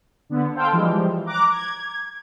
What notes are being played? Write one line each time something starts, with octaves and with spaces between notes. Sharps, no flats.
D3 B3
A4 C5 F5 G5
E3 F3 G3 G#3
A#5 D6 F#6
G#6